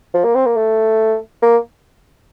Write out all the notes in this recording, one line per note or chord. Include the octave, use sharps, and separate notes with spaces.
F3
A#3
C4
A#3
A3
A#3